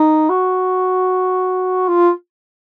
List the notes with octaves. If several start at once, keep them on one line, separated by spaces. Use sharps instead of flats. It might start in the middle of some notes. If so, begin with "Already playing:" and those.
Already playing: D#4
F#4
F4